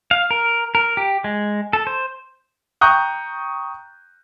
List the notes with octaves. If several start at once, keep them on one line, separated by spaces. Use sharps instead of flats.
F5
A#4
A#4
G4
G#3
A4
C5
G5 A#5 C#6 D#6 F#6 G6